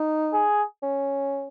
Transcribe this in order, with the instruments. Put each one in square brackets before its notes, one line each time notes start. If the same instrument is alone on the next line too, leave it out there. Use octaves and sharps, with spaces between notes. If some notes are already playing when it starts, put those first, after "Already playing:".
Already playing: [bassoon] D#4
[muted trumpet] G#4
[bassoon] C#4